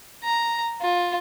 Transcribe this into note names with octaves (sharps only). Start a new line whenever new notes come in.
A#5
F4